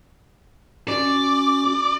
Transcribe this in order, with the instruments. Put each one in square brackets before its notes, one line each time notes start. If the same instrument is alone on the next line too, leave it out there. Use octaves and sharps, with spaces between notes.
[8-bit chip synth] C#4 F#4 [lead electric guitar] D5